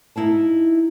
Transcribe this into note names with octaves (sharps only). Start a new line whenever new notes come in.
D#4 E4 F5 A5